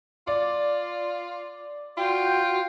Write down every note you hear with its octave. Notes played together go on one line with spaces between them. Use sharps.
F4 D5
F4 F#4 G5